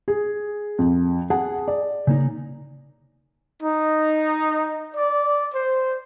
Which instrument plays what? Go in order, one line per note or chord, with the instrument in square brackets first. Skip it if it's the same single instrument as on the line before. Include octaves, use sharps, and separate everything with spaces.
[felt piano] G#4
F2
[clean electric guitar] G#4 A5 [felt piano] F#5
[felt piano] D5
[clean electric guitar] C#3 A#3 D#4
[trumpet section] D#4
D5
C5